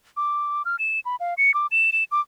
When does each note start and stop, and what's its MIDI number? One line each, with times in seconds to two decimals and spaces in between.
0.17 0.63 86
0.65 0.76 89
0.79 1.00 100
1.05 1.16 83
1.20 1.34 77
1.38 1.54 97
1.54 1.67 86
1.71 1.90 100
1.92 2.04 100
2.12 2.21 86